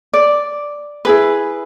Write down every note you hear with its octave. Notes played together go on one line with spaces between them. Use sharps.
D5
E4 G#4 B4